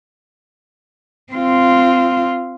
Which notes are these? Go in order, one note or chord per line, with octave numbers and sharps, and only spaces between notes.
C4 F4